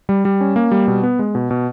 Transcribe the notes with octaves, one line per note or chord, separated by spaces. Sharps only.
G3
G3
C#4
A#3
G3
B2
B3
G#3
B2
B2